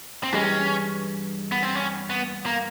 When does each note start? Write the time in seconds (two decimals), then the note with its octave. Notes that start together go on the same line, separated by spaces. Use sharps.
0.23 C4
0.32 G2 E3 G#3 C#4
1.52 B3
1.63 C4
1.75 C#4
2.10 B3
2.46 A#3